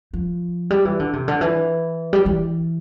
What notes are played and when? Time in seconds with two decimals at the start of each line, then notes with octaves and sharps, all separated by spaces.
0.13 F3
0.70 G3
0.85 E3
1.00 D3
1.13 C3
1.28 D3
1.41 E3
2.13 G3
2.26 E3